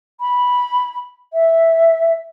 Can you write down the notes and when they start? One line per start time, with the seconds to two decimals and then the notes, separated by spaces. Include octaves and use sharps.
0.21 B5
1.33 E5